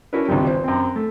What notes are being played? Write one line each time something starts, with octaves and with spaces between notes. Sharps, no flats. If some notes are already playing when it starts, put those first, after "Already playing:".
C#4 D4 E4 F#4 A#4 B4
G#1 C#2 G2 C3 G3
C5
F#2 C4
A3